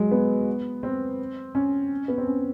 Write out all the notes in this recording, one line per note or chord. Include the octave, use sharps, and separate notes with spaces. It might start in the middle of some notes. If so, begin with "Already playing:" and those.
Already playing: F#3 G#3
B3
C4
C#4
B3
C4
C#4